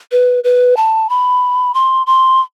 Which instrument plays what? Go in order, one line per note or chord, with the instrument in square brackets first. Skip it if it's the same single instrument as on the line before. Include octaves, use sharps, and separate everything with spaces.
[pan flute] B4
B4
A5
B5
C6
C6